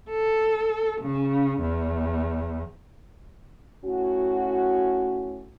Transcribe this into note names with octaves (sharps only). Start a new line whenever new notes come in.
A4
C#3
E2
A2 C#4 F#4